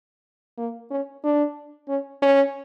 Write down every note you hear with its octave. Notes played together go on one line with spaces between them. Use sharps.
A#3
C#4
D4
C#4
C#4